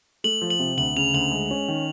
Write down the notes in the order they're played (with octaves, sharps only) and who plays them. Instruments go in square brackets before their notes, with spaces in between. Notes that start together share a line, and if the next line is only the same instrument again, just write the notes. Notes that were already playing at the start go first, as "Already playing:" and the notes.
[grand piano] A3 [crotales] F#7
[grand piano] F3
[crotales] F#7
[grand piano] C3
[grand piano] D2 [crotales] F#7
[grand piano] C#3 [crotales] F7
[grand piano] D2 [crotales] F#7
[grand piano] G#3
C#4
D#3